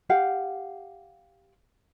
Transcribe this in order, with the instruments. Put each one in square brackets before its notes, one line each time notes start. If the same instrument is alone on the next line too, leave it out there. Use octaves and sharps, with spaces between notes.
[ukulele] G4 F5 F#5